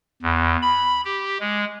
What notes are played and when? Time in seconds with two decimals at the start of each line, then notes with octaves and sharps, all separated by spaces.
0.22 E2
0.62 B5
1.05 G4
1.40 G#3